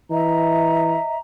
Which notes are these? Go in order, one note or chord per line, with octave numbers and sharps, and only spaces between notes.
E3 D#5 E5 A#5